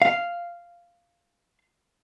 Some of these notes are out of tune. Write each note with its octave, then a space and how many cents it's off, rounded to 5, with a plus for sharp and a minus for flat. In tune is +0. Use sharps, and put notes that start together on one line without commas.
F5 -10